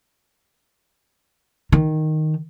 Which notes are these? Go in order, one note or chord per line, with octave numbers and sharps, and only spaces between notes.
D#3